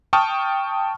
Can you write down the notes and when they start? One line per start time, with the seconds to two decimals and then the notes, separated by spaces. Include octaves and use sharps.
0.13 G5 A5 C#6 D#6 F6